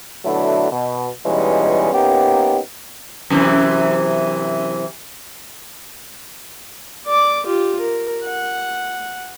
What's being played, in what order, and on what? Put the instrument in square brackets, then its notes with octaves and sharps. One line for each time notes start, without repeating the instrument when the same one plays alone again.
[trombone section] B2 D3 F#3 A3 D4 E4
B2
B2 E3 G3 G#3 C#4 D#4
A#3 B3 C#4 D#4 G4
[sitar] F#2 C3 E3
[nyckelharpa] D5 D6
F4 G4
A#4
F#5